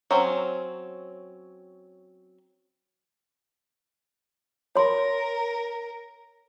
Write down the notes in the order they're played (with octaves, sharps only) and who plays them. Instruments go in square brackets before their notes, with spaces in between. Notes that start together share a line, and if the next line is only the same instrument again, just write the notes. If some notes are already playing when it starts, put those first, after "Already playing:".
[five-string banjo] F#3 C4 C#4
[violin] A#4 [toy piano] C#5 C6